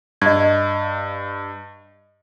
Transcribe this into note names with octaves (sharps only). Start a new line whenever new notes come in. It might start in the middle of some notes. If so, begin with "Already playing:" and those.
G2 D#5 G#6